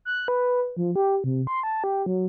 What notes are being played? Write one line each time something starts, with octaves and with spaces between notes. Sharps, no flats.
F#6
B4
F3
G4
C3
C6
A5
G4
F#3